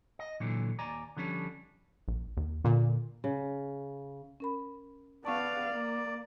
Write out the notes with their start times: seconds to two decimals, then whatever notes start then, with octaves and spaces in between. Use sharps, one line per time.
0.19 D#5
0.40 A#2 D3 E3 F#3
0.79 D#2 D5 G#5 A#5
1.17 D3 F3 G3 C#4
2.08 A#1
2.37 D#2
2.64 A#2 D3
3.24 C#3
4.40 C#4 A#4 B5
5.25 B3 D5 F5 A5 C#6
5.73 A#3